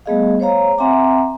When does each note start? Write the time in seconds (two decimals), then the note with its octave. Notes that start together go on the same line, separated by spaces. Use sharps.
0.06 G3 A3 B3 G#4 D#5 F5
0.40 C5 C#5 F5 A#5
0.78 C4 E5 F#5 G#5 A#5 D6